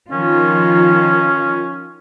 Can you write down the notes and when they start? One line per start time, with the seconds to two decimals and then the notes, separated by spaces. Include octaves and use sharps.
0.11 D#3 F3 C#4 F4